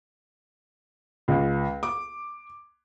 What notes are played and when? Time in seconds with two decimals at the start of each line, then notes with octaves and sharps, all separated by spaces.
1.28 C#2
1.83 D6